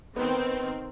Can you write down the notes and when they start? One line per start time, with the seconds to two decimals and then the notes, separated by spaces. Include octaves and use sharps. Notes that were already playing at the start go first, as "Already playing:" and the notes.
0.16 D#3 B3 C4